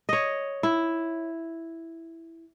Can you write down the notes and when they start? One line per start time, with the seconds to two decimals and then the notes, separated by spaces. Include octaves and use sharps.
0.09 C#5 D#5
0.63 E4